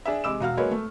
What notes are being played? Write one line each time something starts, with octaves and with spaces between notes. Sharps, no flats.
D4 G#4 E5
C3 G#3 D6 E6 E7
E1 F#4 F5 F6
F#3 G#3 A#3 B4 C#5
A3